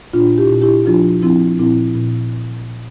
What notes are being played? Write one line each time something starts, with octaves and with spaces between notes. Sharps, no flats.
A#2 D4 F4
E4 G4
A#2
E4 G4
F3 D4 F4
F3 C4 E4
A#2 C4 E4
A#2